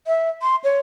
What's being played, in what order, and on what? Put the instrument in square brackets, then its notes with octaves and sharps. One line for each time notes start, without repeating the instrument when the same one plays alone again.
[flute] E5
C6
C#5